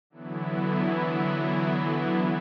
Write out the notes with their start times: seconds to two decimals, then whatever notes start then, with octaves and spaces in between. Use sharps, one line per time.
0.10 D3 E3 F#3 B3 E4